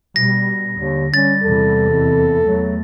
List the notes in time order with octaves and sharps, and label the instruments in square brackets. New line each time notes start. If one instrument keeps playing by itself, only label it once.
[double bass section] B2 G3 [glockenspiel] A#6
[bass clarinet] D#2 [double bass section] D3
[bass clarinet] G3 [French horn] C#4 [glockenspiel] A6
[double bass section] E2 C3 E3 [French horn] A4
[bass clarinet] F2
[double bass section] E2 A3 [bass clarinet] F#3